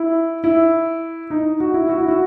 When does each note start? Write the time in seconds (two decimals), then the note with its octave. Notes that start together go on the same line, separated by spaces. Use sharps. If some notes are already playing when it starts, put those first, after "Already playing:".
Already playing: E4
0.44 E4
1.30 D#4
1.60 F#4
1.74 E4
1.89 F#4
1.98 E4
2.08 F#4